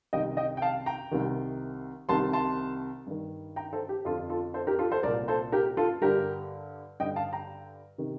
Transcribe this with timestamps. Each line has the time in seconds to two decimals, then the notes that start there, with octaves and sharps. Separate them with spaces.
0.13 C2 C3 D#3 D#5 G5
0.37 D#5 G5
0.57 G5
0.62 F5 A5
0.86 G5 A#5
1.11 C2 C3 D#3
2.09 C2 C3 D#3 A5 C6
2.33 A5 C6
3.07 G2 D#3
3.56 G5 A#5
3.73 A4 C5
3.89 G4
4.05 F2 D3 F4 A4
4.30 F4 A4
4.54 A4 C5
4.67 G4 A#4
4.79 F4 A4
4.91 A4 C5
5.03 C2 A#2 A#4 D5
5.28 A4 C5
5.52 G4 A#4
5.77 F4 A4
6.02 G2 D3 G4 A#4
7.00 G2 D3 D#5 G5
7.16 F5 A5
7.33 G5 A#5
7.98 C3 D#3